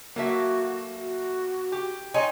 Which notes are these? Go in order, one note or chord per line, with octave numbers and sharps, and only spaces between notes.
F#3 A3 A#3 F#4 E5
F#4
G4
D#4 C#5 G5 G#5 C6